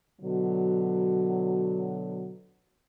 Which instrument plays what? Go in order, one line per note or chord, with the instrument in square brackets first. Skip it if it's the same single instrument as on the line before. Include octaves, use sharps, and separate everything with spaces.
[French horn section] B2 D3 F#3